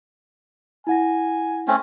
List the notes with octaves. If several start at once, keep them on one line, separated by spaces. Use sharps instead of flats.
E4 F#5 G#5 A#6
A3 C4 C#4